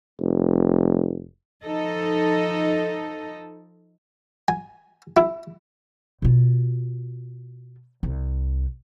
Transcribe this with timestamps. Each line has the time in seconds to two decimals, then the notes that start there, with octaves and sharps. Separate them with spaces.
0.20 F1
1.65 F3 D#4 A4 D#5
4.48 G#5
5.17 E4
6.22 B2 F4
8.03 C2